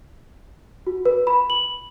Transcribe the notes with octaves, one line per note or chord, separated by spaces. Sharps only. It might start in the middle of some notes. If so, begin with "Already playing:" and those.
F#4
B4
B5
F#7